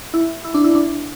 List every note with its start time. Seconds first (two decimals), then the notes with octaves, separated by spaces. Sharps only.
0.14 E4
0.44 E4
0.54 D4
0.64 E4
0.75 D4